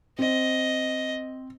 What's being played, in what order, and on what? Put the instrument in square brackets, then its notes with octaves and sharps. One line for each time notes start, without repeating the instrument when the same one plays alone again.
[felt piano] C4 [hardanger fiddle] D#5